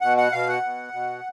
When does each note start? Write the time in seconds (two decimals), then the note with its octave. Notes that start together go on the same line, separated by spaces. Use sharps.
0.01 B2 F#5
0.17 F#5
0.32 B2 F5
0.48 F#5
0.63 B2
0.93 B2